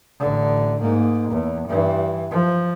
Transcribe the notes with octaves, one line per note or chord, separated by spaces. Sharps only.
A1 D3
G#2 A#3
E2
G2 E3
F3